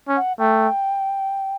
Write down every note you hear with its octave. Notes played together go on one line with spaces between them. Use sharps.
C#4
F#5
A3 G5